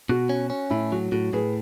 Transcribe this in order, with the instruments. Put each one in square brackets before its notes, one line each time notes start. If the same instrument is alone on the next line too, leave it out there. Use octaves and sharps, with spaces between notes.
[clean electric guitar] B2 [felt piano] F#4
[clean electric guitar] C#4
C#4
[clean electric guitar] A2 [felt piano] E4
[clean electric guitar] F#3 [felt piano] F#4
[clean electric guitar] A2 [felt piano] F#4
[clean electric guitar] A2 [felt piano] G#4 B4